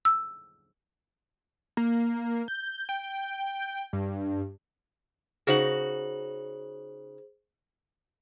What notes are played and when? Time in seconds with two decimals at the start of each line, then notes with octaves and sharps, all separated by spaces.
0.05 E6
1.77 A#3
2.48 G6
2.89 G5
3.93 G2
5.47 C#3 D#4 F#4 G#4 C5 F#7